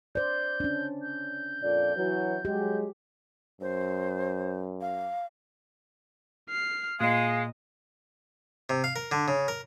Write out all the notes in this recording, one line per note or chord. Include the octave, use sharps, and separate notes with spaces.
C5 D5 G6
C#4 D4
G6
F2 A#2 D5
E3 F#3
F#3 G#3 G4
F#2 C5
F5
F6 C7
A#2 G#3 D#5 F5
C3
F5
A#4
D3
C#3
A#4